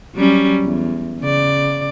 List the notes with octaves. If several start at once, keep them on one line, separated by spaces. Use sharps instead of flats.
F#3 G3 C#4
E2
C#3 D5